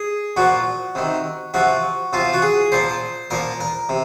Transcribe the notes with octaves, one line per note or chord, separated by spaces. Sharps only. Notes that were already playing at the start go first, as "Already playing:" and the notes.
Already playing: G#4
A#2 F3 F#4
C3 D#3
C3 F3 F#4
C3 F3 F4
F#4
G#4
A#2 F3 C5
A#2 F3 A#4
A#4
C3